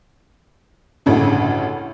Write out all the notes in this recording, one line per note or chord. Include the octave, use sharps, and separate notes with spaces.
A1 D2 G2 C#3